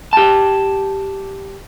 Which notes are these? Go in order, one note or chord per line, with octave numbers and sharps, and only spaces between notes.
G4 A5